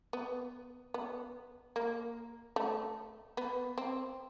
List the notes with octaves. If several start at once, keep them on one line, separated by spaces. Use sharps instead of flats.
B3
B3
A#3
A3
B3
C4